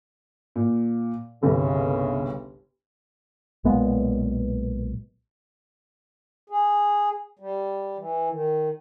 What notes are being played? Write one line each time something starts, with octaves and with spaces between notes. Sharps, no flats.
A#2
G1 C2 C#3
B1 A#2 G#3 B3
G#4
G3
E3
D#3